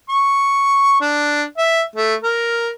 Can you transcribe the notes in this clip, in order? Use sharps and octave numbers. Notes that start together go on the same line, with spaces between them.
C#6
D4
E5
A3
A#4